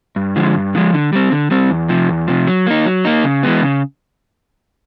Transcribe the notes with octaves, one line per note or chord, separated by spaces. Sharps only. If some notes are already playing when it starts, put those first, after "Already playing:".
G2
D3 F3 G#3
G2
D3 F3 G#3
D3
G3 C4
D3
G3 C4
E2
C3 F3
E2
C3 F3
F#3
A#3 D#4
F#3
A#3 D#4
C#3
E3 G#3 B3
C#3